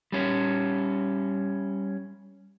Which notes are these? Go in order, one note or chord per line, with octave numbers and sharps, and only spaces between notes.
G3 C#4